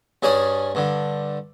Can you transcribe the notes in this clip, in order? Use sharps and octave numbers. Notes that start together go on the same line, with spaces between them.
G2 C#4 G#4 D5 G#5 D#6
G2 D3